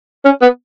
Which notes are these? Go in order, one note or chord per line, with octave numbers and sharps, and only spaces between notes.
C#4
B3